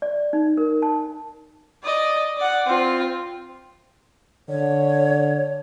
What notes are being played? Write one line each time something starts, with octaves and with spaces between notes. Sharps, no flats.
D5
D#4
A#4
A5
D5 D#5
D5 F#5
C4 F4
D3 C#5